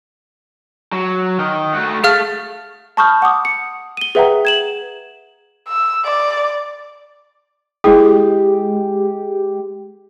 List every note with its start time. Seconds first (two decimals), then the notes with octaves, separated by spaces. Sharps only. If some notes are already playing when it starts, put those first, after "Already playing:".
0.92 F#3
1.39 D#3
1.74 A3 F#4
2.04 A3 G#4 F5 F6
2.97 A5 B5 C#6 D#6 F6 G6
3.22 F#5 D6 D#6
3.45 C#7
3.97 D#7 G7
4.15 G#4 B4 E5 F#5 G5 A#5
4.45 G#6 E7 F#7
5.68 E6
6.05 D5
7.84 G#3 E4 G4 G#4